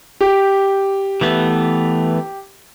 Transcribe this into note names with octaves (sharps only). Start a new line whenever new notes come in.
G4
E3 A3 B3